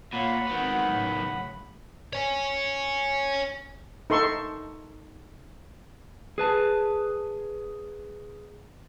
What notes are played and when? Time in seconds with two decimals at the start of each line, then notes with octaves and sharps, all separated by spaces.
0.13 A#2 C#5 F5 F#5 B5
0.47 D#3 G#3 B3 C4 F#4
0.91 A2 C#3 F#3
2.13 C#5 G#5
4.10 D#4 A4 C6 C#6
6.38 G#4 B4 A5